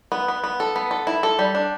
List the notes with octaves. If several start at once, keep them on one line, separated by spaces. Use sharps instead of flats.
B3
B3
B3
A4
B3
A4
E4
A4
G3
D4